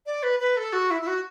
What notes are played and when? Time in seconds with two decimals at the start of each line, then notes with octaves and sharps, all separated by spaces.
0.06 D5
0.23 B4
0.39 B4
0.57 A4
0.73 F#4
0.91 E4
1.02 E4
1.07 F#4